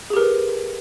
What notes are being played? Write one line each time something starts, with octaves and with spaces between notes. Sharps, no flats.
G4 G#4 A#4 B4